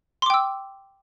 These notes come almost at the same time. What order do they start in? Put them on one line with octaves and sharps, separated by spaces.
C6 D6 G5 E6